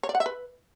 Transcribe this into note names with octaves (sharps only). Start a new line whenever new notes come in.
C#5
D5
F#5
E5
B4